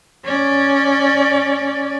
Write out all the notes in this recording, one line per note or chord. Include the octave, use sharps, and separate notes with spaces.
C#4 D5